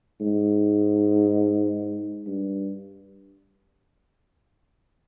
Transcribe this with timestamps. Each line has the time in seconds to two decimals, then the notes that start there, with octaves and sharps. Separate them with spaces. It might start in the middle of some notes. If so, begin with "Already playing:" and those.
0.20 G#2
2.27 G2